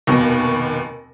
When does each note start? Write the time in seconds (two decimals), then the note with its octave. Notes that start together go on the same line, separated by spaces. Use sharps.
0.07 F1 D#2 B2 A#6